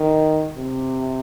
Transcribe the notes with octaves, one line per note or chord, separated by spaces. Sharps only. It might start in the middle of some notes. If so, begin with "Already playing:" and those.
Already playing: D#3
C3